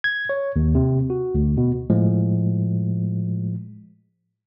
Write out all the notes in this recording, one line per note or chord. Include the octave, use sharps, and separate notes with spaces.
G#6
C#5
D#2
C3
F#4
D2
B2
A2 F3 G#3